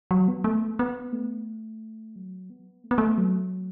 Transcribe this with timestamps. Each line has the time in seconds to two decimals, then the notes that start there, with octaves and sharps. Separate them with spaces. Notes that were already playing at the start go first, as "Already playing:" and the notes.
0.11 F#3
0.28 B3
0.44 A3
0.79 B3
1.13 A3
2.16 F#3
2.50 B3
2.84 A3
2.91 B3
2.98 A3
3.18 F#3